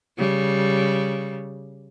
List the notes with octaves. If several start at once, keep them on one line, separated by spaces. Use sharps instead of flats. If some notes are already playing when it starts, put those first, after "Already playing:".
C#3 G3